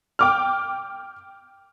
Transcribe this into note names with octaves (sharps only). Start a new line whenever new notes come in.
G5 D6 F6